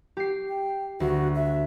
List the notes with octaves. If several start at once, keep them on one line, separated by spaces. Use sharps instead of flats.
G4 C7
G5
D2 F#4
E5